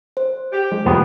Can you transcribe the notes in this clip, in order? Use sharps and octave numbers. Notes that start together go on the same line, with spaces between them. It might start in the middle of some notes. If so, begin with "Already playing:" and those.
C5
G4
F3 G#3
E2 G#2 B2 F3 G3 B3